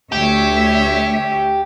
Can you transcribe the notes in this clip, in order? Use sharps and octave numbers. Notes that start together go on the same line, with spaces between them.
D2 G4 C#5 E5